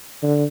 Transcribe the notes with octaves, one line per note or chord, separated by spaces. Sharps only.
D3